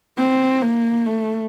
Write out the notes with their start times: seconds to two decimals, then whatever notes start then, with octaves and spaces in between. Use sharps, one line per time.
0.17 C4
0.61 A#3
1.05 A3